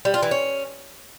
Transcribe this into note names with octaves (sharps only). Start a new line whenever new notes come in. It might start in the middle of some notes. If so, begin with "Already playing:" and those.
G3
F4
E3
C#4